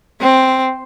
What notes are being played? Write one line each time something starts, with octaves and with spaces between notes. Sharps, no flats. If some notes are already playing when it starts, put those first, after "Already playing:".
C4